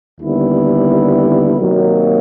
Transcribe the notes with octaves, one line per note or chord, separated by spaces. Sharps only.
D#2 D3 G3 B3 E4
C3 D#3 F#3 A#3